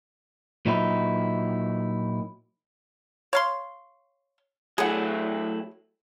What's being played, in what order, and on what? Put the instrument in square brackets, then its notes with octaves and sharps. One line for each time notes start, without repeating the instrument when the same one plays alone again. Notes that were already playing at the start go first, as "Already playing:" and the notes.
[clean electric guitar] A#2 F#3 D#4 E4
[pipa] C#5 F5 C6
[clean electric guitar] F#3 A3 E4 [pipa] G#4 F#5